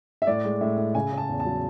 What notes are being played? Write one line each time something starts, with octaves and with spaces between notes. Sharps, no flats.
E5
A2 D5
G#3
A2 E5
A2
C#3 G#5
C#3
A5
E2
A5
F#3